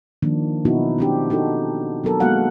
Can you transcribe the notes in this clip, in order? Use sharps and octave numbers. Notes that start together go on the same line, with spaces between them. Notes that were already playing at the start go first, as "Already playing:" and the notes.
D#3 F3 A#3 D4
B2 F#3 B3 D#4 E4 F#4
C4 D4 G4
D4 D#4 F#4 A4
F#3 B3 A4 A#4
G#3 A#3 B3 F#4 F5 F#5